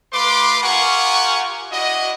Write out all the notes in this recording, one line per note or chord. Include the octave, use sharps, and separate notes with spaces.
A3 F4 B4 C6 D6
F4 G4 A#4 F#5 G#5 C#6
D4 E4 F#4 D#5